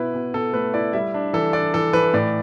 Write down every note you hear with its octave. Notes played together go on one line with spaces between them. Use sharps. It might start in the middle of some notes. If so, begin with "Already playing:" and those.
Already playing: B2 E4 B4
B2
B2 A4
A3 B4
E4 D5
G3 E5
D4
E3 A4
D4 D5
E3 A4
E3 B4
A2 D5